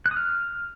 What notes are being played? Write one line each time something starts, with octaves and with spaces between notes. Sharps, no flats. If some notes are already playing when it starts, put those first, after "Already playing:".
F#6
D#6
F6